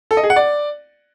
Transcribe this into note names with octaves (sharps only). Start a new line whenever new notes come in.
A4
D#5
G#4
F#5
D5